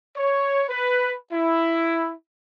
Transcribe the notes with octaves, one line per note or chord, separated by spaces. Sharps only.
C#5
B4
E4